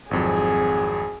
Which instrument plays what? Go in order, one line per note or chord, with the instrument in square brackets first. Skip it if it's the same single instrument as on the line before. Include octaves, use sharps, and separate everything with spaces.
[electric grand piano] G#1 F2 F#3 [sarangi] G#4